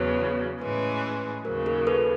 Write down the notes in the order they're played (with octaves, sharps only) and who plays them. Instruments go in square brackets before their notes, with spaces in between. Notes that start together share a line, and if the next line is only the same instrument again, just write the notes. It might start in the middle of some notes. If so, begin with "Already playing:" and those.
Already playing: [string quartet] E2 C#3 F#3 [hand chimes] B4 C#5
[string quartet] A2 E3 G#3 C#4 [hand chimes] B4 C#5
[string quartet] D#2 C#3 F#3 [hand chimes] A#4 C5
[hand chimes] G#4 A#4
A4 B4